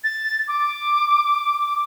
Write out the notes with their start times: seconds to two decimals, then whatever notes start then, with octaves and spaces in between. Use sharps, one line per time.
0.04 A6
0.48 D6